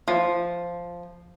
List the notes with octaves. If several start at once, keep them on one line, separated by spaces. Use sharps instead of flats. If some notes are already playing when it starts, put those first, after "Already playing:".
F3